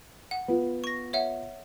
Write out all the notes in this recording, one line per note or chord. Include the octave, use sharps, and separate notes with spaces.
F#5
B3 F4
C#6 A#6
C#5 E5 F#5